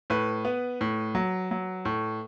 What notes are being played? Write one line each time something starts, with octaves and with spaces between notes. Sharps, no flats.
A2 B4
B3
A2
F#3
F#3
A2